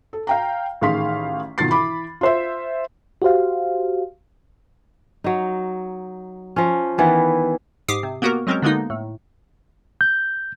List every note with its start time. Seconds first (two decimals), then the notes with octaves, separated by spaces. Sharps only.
0.13 A4
0.27 F5 G5 A#5
0.81 A1 D#3 G#4 F5 C6 B6
1.58 B2 D#3 F4 A6 C7
1.70 E3 B5 D6
2.21 F4 C5 E5
3.22 F#4 G4 C5 F5
5.24 F#3 D#4
6.56 F3 C#4
6.98 D#3 E3 B3 E4
7.88 G#2 G4 D6 D#6 C7
8.03 C3
8.22 A#3 B3 F#4 G4 A#4
8.47 F#3 G#3 C4 C#4 F#4 A#4
8.62 D3 G#3 A#3 B3 D#4
8.90 A2
10.01 G6